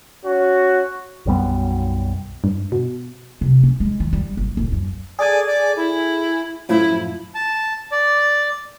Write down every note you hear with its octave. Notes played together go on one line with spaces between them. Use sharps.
C#4 F#4
B1 F#2 G3 B3
G2
B2
C3
C#4
G#3
D#3
G3
G1
D1
F#2
G#4 A4 D5 G#5
D5
E4
F#2 A2 F3 E4
A5
D5